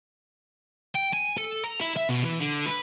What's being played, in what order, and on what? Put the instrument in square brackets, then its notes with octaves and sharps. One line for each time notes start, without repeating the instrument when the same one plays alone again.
[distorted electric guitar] G5
G#5
A4
A#5
E4
E5
B2
E3
D3
B4